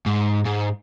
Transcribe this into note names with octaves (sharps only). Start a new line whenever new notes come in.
G#2
G#2